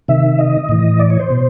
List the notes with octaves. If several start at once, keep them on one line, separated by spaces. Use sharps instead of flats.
C3 D#3 E5
D#5
A2 E3
D5
C#5
C5
B2